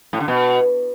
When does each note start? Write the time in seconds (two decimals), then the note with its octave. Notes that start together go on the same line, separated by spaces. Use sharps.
0.13 A2
0.20 D3
0.28 B2